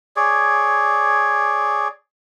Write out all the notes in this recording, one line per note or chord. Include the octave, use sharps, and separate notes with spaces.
G#4 C#5 D5